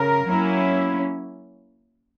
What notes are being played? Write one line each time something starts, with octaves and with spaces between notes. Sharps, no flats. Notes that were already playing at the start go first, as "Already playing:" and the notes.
Already playing: C#3 A#4
F#3 A#3 C#4 E4